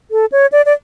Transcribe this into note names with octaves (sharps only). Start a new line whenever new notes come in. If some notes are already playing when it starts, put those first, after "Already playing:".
A4
C#5
D5
D5